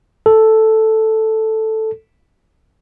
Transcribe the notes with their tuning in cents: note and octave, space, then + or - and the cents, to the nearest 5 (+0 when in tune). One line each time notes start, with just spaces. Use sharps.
A4 +0